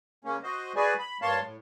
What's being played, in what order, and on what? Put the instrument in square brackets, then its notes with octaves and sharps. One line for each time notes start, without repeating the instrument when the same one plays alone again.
[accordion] C#3 A#3 C#4
F#4 C5 D#5
F#4 G#4 B4 D5 G#5
B5
G2 A#3 C#5 F5 A5 C6
A2